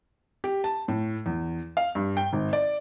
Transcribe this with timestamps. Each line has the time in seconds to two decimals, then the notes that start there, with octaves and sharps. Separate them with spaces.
0.44 G4
0.64 A5
0.88 A2
1.26 E2
1.77 F5
1.95 G2
2.17 G5
2.33 G#1
2.53 D5